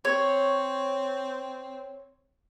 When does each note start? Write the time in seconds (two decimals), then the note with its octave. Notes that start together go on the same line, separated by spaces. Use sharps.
0.05 C4 C#5